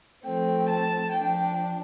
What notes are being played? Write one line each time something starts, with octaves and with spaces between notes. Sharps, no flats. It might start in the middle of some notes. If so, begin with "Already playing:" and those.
F3 A3 C4 G5
A5
F3 D4 G5